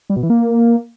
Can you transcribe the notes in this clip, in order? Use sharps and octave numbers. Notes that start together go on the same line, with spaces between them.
G3
B2
E3
A#3